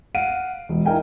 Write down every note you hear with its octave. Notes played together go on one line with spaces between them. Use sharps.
F5 F#5 D7 D#7
E1
D#4 E4 A#4 F5 G5 G#5